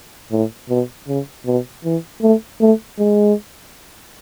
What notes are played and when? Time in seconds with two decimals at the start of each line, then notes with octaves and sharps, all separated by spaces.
0.32 A2
0.70 B2
1.08 C#3
1.46 B2
1.85 E3
2.22 A3
2.61 A3
2.99 G#3